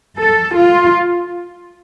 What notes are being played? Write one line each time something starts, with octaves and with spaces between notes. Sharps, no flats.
A4
F4